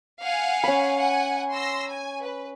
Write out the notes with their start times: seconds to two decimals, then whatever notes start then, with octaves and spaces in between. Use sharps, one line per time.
0.21 F5 F#5 G#5
0.64 C#4 B5
0.97 F#5 G#5
1.52 C6 E6 A#6
1.89 G#5
2.23 B4